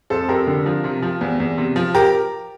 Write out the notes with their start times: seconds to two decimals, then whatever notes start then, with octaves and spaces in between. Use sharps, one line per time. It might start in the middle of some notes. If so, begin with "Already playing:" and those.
0.10 F2 A4 C5
0.29 F2 G4 A#4
0.47 D3
0.66 F3
0.84 C3
1.02 F3
1.21 E2
1.40 E2
1.58 C3
1.76 F3
1.94 G4 A#4